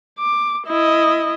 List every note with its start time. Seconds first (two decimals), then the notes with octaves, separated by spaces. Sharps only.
0.19 D6
0.67 E4 D#5